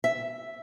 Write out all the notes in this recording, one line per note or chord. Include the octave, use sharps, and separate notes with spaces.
E5